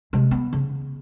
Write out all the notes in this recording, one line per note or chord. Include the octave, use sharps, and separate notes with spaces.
C3 G#3
B3
C#3